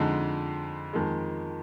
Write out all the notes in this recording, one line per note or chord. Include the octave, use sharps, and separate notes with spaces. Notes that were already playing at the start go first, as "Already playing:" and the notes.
Already playing: F2 D3 G#3 D#4
F2 D#3 G#3